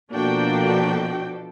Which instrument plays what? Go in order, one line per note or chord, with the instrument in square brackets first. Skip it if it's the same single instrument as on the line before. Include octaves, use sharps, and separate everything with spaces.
[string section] B2 F3 A4 [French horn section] A#3 [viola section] D4 F#4 G5